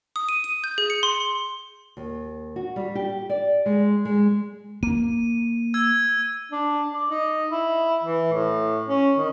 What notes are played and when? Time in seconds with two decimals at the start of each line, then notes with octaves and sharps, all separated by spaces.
0.16 D#6
0.29 D#7
0.44 D#7
0.64 G6
0.78 G#4
0.90 C#7
1.03 C6
1.97 D#2
2.56 F#4
2.76 G3
2.95 G4
3.29 D5
3.66 G#3
4.05 G#3
4.83 A#3 D#7
5.74 E6 G#6
6.51 D4
6.94 D5
7.10 D#4
7.51 E4
8.03 E3
8.33 A2
8.88 C#4
9.17 D#3